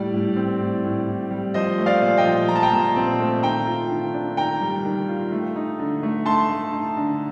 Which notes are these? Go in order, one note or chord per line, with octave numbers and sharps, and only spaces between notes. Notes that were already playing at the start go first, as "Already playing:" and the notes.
Already playing: A2 G3 D5
A2
C4
A2
A2
A2
G3
F3 C5 D#5
A3
D5 F5
A#2
D#5 G5
F3
F3 A#5
A5
G5 A#5
A#2
C4
A3
D#3 G5 A#5
F4
D#3
D4
D#3 G5 A#5
G3
D#3
F4
A3
D#4
D3
A3
A3 A5 C6
A3
D#4
D3